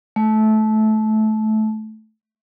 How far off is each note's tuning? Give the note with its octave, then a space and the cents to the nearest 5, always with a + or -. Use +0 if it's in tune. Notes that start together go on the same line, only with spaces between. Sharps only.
A3 -20